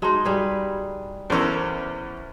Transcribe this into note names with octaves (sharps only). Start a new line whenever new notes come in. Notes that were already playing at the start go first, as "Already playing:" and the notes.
G#3 D#4 F#4 A5 C6
G3 G#4 B4
E2 C#4 A4 A#4 C5